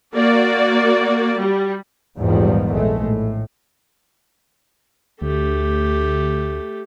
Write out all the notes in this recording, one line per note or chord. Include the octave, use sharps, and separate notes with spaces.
A#3 F#4 D5
G3
A#1 E2 G#2 D#3 F3 G3
A#1 G#3 A3
A2
D2 A3 G4